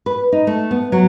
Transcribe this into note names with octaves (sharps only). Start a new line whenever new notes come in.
B4
D#4
A3
B3
F#3